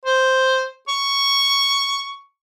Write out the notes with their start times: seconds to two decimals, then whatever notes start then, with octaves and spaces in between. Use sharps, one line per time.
0.05 C5
0.88 C#6